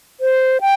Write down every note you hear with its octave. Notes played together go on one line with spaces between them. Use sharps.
C5
G5